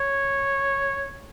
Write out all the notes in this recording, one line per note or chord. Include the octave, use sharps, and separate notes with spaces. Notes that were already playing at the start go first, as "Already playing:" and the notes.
Already playing: C#5